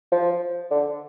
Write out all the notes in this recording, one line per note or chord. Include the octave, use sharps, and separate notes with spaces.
F3
D3